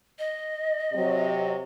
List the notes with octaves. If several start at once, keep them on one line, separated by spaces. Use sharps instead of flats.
D#5
C3 F#3